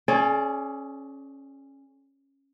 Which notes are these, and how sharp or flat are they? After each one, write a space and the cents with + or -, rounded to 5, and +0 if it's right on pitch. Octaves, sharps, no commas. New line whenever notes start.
C#4 -15 G#4 +40 D5 +0